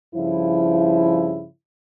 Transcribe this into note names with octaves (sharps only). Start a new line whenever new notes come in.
G2 C#3 F3 E4